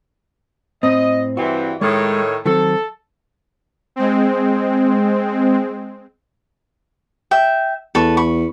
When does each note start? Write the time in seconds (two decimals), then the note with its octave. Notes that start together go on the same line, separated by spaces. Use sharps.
0.83 A2 C4 D#5
1.37 G2 E3 C4 F#4
1.81 A2 D#3 G#3 C#5
2.46 D#3 F#3 C4 A4
3.96 G#3 C4
7.31 E5 G5
7.95 E2 A4 B4 C#6
8.17 B5 C#6